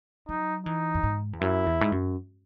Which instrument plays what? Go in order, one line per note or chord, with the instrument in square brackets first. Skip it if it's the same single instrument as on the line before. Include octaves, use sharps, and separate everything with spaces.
[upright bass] F#3 [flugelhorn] D#4
[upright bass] E3 [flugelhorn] D#4
[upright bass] F#2
G#2
E2
[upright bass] F#2 [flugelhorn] E4
[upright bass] E2
G#2
F#2